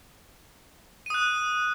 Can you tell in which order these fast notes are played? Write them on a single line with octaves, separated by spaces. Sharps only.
D#7 D#6 F#6